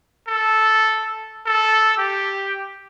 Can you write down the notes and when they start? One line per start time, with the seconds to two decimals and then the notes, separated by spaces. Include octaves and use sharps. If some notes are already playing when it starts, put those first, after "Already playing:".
0.29 A4
1.47 A4
1.98 G4